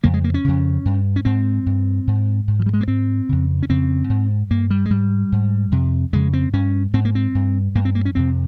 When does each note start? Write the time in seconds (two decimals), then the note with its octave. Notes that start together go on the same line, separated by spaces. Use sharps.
0.03 F2 C#3 A#3
0.14 G#3
0.24 A#3
0.34 C#4
0.44 F2 C#3
0.85 G2
1.16 C#4
1.25 G#2 C4
1.66 G2
2.07 G#2
2.48 G#2
2.59 F3
2.66 G3
2.73 G#3
2.81 A#3
2.87 G#2 C4
3.29 F2 C#3
3.63 C#4
3.69 F2 C#3 C4
4.09 G#2
4.50 G2 A#3
4.70 G3
4.86 G#3
4.90 G#2 G3
5.32 G#2
5.71 F2 C3
6.13 F2 C#3 G#3
6.33 C4
6.53 G2 C#4
6.93 G#2 C4
7.05 A#3
7.15 C4
7.35 G2
7.75 G2 A#3
7.85 C4
7.95 A#3
8.05 C#4
8.15 F2 C3 C4